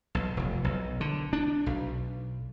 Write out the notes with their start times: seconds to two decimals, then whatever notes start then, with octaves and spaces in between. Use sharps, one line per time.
0.15 B1
0.37 F1
0.64 B1
1.01 D3
1.33 D4
1.66 B1